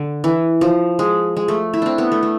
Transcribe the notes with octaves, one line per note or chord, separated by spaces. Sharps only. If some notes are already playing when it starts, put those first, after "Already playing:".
Already playing: D3
E3
F3
G#3
G#3
A3
E4
C4 D4
B3
A3
A3